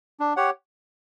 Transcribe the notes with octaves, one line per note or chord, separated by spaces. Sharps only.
D4
G4 C#5 F#5